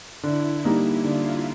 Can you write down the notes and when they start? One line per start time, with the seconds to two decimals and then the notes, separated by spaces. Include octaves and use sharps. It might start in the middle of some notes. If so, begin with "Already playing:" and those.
0.23 D3 E4
0.64 G3 A#3 D#4
1.04 D3 F4